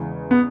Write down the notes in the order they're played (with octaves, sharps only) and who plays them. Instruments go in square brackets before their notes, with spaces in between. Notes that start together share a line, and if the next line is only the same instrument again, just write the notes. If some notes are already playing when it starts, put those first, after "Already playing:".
Already playing: [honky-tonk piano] E2 C#3 E3 G#3
[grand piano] B3